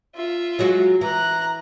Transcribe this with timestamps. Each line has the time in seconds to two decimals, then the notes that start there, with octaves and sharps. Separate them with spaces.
0.15 F4 E5
0.59 F#3 G#3 F#4
1.01 E3 A#5 F#6